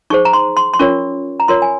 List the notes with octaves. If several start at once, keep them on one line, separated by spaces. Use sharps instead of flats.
D#4 G#4 C5 C#6
A#5
C6
C6
C6
C#4 F4 A#4 C#5 C#6
A#5
F4 A#4 C#5 C6
G#5